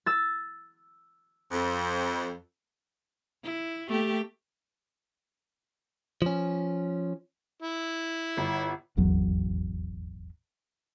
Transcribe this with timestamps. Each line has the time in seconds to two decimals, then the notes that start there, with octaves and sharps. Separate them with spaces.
0.06 E6 A6
1.52 F2
3.44 E4
3.88 A3 A#3 G4
6.22 F3 C#4
7.62 E4
8.37 G1
8.97 D#1 G#1 E2 F#3